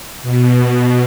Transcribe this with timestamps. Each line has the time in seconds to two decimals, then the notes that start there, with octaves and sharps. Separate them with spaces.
0.22 B2